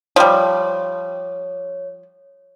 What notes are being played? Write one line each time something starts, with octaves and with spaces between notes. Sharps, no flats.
F3 G3 C#5